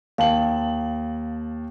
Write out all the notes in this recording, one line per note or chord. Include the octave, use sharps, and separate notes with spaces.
D#2 F5 A5 F#7